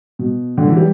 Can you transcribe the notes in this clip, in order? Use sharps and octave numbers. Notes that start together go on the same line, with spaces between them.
B2
D3
E3
G3